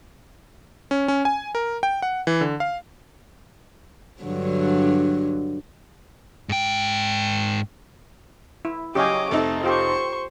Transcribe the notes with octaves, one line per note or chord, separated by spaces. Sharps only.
C#4
C#4
G#5
A#4
G5
F#5
E3
D3
F5
G2 D3 F#3
G#2 G5
E4
C#3 F#3 G4 C#5 D#5 F5 G#5 D6
F1 A3 C4 D#4
F4 G4 A4 C5 C#6